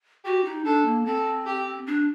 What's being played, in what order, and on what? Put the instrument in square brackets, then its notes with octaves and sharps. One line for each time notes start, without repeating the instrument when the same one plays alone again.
[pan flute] F#4 [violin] G4
[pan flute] D#4
[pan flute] D4 [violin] A4
[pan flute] A#3
[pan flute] C4 [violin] A4
[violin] G4
[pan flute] D4